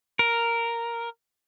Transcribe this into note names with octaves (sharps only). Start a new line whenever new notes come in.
A#4